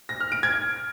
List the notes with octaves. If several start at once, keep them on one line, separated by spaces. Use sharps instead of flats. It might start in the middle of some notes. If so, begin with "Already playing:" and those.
A#6
F6
D7
G#6